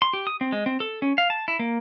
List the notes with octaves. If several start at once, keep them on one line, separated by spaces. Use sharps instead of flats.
C6
G4
D#6
C4
G#3
C4
A4
C#4
F5
A5
E4
A#3